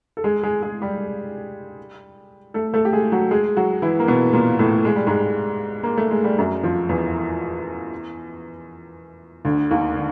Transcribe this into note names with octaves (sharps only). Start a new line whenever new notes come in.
A4
G#3 G#4
G#3 G#4
G#3 G#4
G3 G4
A3 A4
A3 A4
G4
G#3 G#4
F#3 F#4
G#3 G#4
F#3 F#4
E3 E4
A#3
B2 B3
A#2 A#3
A2 A3
G#3
G3
G#2 G#3
A#3
A3
G#3
G3
F#2 F#3
F2 F3
E2 E3
D2 D3
D#2 D#3
D3